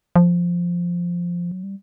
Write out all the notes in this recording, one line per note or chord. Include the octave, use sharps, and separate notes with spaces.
F3
F#3
G3